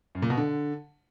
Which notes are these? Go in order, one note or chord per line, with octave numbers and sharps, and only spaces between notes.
F#2
A#2
B2
D3